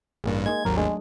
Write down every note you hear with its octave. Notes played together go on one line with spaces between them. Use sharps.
A1 G2 A#3 G#4
G#3 A#3 D#4 G#6
G#1 D#2 F#3 A#4
G#3 A3 D4 G#4